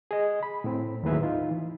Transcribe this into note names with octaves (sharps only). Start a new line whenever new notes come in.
G#4 D#5
B5
A2 C4
D#2 A2 F#3 G#4 B4 E5
D#4 F4
E3